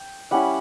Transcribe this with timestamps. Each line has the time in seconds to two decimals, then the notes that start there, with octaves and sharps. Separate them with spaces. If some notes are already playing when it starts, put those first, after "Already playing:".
Already playing: G5
0.31 G3 C#4 E4 F#5